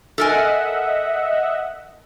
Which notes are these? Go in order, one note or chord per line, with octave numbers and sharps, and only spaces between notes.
A4 A#4 D#5 E5 F#5 G#5